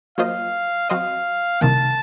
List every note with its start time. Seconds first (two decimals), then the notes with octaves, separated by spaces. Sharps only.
0.18 F#3 A#3 F4 C5 D#5 F5
0.89 F#3 C4 F#4 C5 D#5 F5
1.61 C2 C3 D#3 A#3 A5